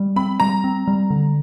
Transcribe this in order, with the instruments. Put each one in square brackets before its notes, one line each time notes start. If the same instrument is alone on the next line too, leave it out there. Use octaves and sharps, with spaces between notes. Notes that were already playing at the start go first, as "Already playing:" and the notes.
Already playing: [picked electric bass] G3
[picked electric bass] C4 [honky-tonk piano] B5
[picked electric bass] G3 [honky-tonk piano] A#5
[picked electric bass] C4
G3
D3